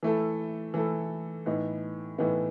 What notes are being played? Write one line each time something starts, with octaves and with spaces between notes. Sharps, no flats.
E3 A3 E4 A4
E3 A3 E4 A4
A2 E3 B3 D#4
A2 E3 B3 D#4